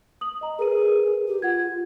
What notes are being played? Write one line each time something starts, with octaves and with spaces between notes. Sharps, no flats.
D#6 F#7
D#5 A#5
G#4 A#4 B4 D#7
G4
F4 F#5 G#6